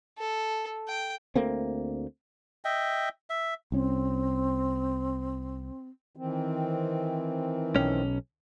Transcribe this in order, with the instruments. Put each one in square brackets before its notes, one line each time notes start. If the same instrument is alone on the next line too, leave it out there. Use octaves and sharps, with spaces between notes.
[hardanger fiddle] A4
G5
[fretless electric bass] D2 A3 A#3 C4
[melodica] D#5 E5 G5
E5
[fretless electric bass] C2 C#4 [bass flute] C4
[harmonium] D#3 E3 C4
[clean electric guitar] B1 C#4